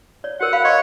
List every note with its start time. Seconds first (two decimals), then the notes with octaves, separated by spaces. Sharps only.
0.24 C#5 D5
0.41 F#4 A#4 F#5
0.53 F5 B5
0.65 C#5 D#5 C6 C#6